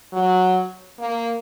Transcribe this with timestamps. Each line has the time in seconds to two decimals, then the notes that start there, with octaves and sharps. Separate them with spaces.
0.13 F#3
0.99 A#3